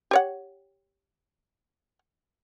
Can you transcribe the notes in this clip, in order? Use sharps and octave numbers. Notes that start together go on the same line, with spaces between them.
G4 C#5 F#5